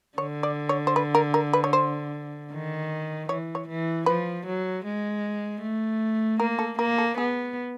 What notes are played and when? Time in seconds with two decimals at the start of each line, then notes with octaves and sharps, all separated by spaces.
0.18 D3 C#5
0.43 D5
0.69 C#5
0.87 C5
0.96 B4
1.15 A#4
1.34 A#4
1.53 B4
1.64 C#5
1.73 C5
2.51 D#3
3.28 E3 C#5
3.55 C#5
3.68 E3
4.06 F3 B4
4.46 F#3
4.84 G#3
5.62 A3
6.40 A#3 A#4
6.59 A4
6.78 A#3 A#4
6.98 A4
7.17 B3 G#4